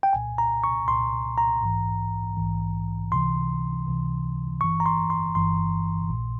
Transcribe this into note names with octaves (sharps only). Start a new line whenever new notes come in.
G5
C2 A#2 G#5
A#5
C#6
C2 A#2 C6
A#5
A#1 G#2 E3
A#1 G#2 E3
C#2 C3 E3 C6
C#2 C3 E3
G1 G2 E3 C#6
A#5
C6
C6
G1 G2 E3 C6
A#1 A#2